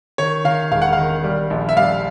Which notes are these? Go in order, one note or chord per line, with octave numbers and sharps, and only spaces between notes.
D#3 C#5
D#3 F5
E1 F5
F#5
D#3 F5
G3
A#1
E5
G3 F5